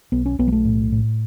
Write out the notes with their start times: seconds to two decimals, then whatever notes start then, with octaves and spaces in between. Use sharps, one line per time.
0.12 B1 B3
0.26 C#4
0.39 B1 B3
0.48 G3
0.52 A3
0.65 A2
0.92 A2